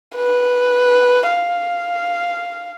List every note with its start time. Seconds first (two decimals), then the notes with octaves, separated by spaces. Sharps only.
0.16 B4
1.29 F5